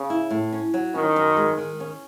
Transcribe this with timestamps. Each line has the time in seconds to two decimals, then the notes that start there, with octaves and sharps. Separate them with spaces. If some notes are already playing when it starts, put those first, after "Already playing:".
Already playing: C#3
0.10 E4
0.31 A2
0.52 C#4
0.74 F#3
0.94 D#3 C#4
1.16 F#2
1.37 G#3
1.58 D#3
1.80 C#4